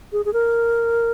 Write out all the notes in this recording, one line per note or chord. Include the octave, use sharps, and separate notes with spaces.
G#4
G#4
A#4